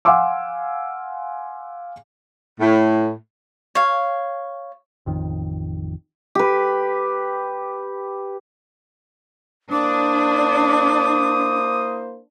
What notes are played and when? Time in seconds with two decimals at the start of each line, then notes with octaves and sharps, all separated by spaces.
0.05 F5 F#5 G#5 C6 D6 E6
2.60 A2
3.75 C#5 F5
5.06 A1 F2 D#3
6.35 G4 B4
9.71 A#3 D4 E4 C5 D6 D#6